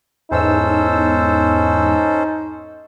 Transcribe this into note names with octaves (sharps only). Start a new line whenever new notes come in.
E2 G#2 C#4 D#4 A4 C5 E6